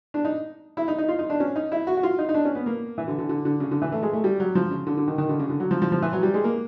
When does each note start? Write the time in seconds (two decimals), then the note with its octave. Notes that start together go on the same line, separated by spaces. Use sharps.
0.14 D4
0.25 D#4
0.77 E4
0.88 D#4
0.98 D#4
1.08 F4
1.19 D#4
1.30 D4
1.40 C#4
1.56 D#4
1.72 E4
1.87 F#4
1.97 F#4
2.03 F4
2.19 D#4
2.29 D#4
2.34 D4
2.45 C#4
2.55 B3
2.66 A#3
2.98 E3
3.08 D3
3.19 D3
3.29 D3
3.45 D3
3.60 C#3
3.71 D3
3.82 E3
3.92 A3
4.03 G#3
4.13 A3
4.24 G3
4.40 F#3
4.55 F3
4.71 C#3
4.87 D3
4.97 D3
5.08 D#3
5.18 D#3
5.29 D3
5.39 C#3
5.50 D3
5.60 F#3
5.71 F3
5.82 F3
5.92 F3
6.02 E3
6.13 F#3
6.23 G3
6.34 G#3
6.44 A#3